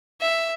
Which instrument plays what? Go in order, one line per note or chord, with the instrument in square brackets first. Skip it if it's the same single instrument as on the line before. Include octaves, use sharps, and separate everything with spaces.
[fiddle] E5